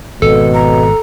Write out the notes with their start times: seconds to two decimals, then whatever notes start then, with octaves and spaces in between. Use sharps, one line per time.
0.22 G#1 B2 A4
0.54 A#5